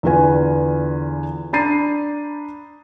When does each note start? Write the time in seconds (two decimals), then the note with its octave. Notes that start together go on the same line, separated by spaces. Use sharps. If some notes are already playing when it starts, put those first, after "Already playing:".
0.03 E2 D3 F4 B4 G#5
1.53 D4 A#5 B5 A6 C7 D#7